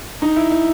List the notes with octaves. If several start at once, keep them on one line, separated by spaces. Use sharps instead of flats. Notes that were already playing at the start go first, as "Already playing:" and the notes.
D#4
E4
E4